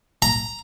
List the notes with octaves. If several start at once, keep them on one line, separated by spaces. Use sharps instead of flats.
A#5